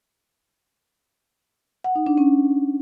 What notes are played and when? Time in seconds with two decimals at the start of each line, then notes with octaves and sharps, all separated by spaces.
1.84 F#5
1.95 D#4
2.06 D4
2.18 C#4